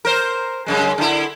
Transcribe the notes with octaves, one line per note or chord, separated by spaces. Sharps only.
A#4 C5
F#2 C#3 G#3
D3 E4